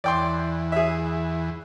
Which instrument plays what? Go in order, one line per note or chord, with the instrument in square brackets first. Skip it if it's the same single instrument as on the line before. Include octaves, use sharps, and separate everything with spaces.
[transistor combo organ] E2 [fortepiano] D5 G5 C6
[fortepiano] G#4 E5